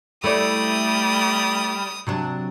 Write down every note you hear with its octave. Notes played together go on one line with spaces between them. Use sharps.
G3 A3 E4 D5 D#6
C3 F#3 D4